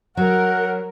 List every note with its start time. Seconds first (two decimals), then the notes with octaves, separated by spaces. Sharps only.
0.17 F#3 A#4 F#5